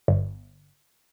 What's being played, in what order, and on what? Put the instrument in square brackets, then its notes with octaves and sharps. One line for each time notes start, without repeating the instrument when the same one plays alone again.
[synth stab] G1